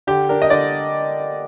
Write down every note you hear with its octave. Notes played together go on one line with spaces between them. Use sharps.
D3 G4
D4 A#4
D#5
D3 D5